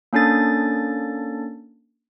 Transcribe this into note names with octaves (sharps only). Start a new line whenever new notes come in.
A#3 C#4 D4 A4 A6